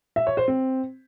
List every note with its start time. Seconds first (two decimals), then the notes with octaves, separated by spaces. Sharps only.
0.16 E5
0.27 C#5
0.37 C5
0.48 C4